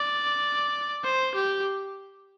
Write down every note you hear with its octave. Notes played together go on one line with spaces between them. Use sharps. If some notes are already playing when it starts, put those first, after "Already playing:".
Already playing: D5
C5
G4